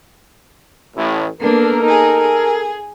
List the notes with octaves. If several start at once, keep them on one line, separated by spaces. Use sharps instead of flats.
A1 A2
A#3 B3 D4 A4 A#4
D#4 G#4
G#4